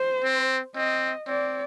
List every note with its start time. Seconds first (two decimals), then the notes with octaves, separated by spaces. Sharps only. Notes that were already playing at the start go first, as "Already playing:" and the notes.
Already playing: C5
0.24 C4
0.75 C4 D#5
1.27 C4 D5